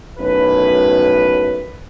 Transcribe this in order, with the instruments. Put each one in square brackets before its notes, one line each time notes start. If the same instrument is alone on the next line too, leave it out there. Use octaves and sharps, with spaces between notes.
[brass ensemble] B1 F#2 A2 B4